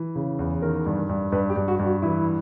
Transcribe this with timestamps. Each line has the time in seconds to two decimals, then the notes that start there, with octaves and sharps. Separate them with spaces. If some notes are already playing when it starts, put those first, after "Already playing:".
Already playing: E3
0.15 C#3
0.39 E2
0.62 D#3 A#4
0.86 G2
1.09 G2
1.32 G2 B4
1.50 G4
1.56 G2
1.68 F#4
1.79 G2
1.86 F#4
2.02 E3 E4